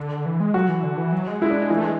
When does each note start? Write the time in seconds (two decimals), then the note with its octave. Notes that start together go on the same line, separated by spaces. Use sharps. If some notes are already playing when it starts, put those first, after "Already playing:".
Already playing: D3
0.26 E3
0.40 G#3
0.54 F#3 F#4
0.69 E3
0.83 D3
0.97 E3
1.12 F#3
1.27 G#3
1.41 G#3 E4
1.51 D4
1.70 E3
1.77 A3
1.84 G#3